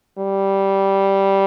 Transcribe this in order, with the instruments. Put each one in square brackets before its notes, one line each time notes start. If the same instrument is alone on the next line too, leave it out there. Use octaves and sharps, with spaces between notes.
[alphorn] G3